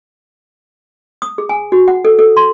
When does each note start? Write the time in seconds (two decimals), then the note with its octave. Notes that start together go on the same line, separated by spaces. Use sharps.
1.22 D#6
1.38 G#4
1.49 G#5
1.72 F#4
1.88 F#5
2.05 A4
2.19 A4
2.37 C6